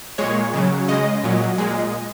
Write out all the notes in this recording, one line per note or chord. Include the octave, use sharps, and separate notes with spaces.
A#2 G#3 C#5
C#3 F#3
C#3 G#3 D#5
A#2 F#3
A#2 G#3